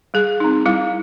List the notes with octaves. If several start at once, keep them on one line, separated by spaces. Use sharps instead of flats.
G3 G#4
C4 D#4
G3 E4